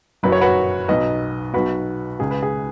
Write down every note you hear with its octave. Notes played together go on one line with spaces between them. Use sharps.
F#1 F#2 F#3 B4
C#5
F#4 B4
B1 B2 F#3 B4 D#5
B1 B2 F#3 F#4 B4
C#2 C#3 G#3 G#4
B4
G#4